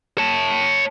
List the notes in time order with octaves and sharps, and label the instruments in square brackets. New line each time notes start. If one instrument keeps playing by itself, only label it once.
[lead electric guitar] C#5 A5